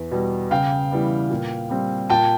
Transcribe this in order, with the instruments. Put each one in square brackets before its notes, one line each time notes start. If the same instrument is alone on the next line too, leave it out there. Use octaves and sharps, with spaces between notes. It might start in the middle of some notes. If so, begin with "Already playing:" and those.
Already playing: [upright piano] E2
B2 G3
C#3 F5 G5
E3 G3 B3
A#2
G3 C4
A#2 G5 A5